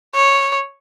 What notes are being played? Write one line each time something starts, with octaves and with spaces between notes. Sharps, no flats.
C#5